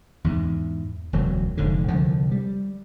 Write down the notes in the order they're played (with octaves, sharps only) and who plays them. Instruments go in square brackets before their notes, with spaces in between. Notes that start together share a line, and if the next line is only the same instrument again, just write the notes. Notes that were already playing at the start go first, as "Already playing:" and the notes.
[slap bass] E2 G#2
E1 D2 F#3
F1 G#2 D3
C2 D3 F3
G3